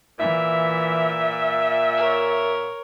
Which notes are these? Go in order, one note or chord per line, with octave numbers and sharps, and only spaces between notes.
A#2 E3 E5
A#4 C#5